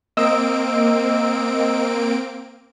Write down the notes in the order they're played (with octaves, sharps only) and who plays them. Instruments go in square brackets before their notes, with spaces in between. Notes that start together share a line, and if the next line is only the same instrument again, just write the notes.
[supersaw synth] A#3 C4 D7 [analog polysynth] D#5 E6